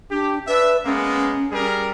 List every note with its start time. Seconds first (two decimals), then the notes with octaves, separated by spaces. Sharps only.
0.11 D4 G4
0.48 D4 B4 E5
0.85 G#3 A#3 B3 C#4
1.51 G3 G#4 A#4